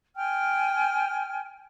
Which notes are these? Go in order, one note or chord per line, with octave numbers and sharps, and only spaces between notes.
G5 G#5 F6